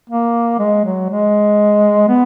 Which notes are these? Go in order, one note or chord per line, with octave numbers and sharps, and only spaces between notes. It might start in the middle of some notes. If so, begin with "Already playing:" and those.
A#3
G#3
F#3
G#3
B3